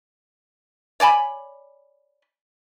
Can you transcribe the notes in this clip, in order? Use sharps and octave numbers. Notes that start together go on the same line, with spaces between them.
C#5 D5 G#5 B5